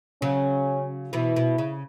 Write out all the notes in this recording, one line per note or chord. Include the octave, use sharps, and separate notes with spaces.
C#3 F#3 C#4
B2 E3 E4
B2
C#3